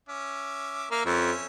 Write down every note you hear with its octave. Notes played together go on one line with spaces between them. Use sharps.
C#4 E5 D6
A#3 E5 F6
F2 C#4 E5